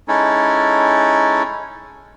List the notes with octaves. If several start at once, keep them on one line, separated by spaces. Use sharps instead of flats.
G#3 C#4 D#4 E4 A4